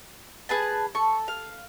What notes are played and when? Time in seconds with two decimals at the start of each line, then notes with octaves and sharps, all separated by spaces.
0.49 G#4 B4 A5
0.95 A4 C#6
1.28 F5